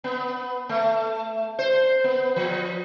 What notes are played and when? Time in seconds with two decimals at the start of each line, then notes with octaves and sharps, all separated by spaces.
0.04 B3
0.69 A3
1.59 C5
2.04 B3
2.36 F3